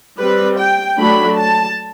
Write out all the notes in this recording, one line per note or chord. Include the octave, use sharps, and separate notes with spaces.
G3 C4 B4
G5
F#3 A3 D4 B5
A5